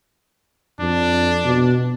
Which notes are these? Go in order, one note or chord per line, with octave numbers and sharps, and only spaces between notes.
F2 D4
B2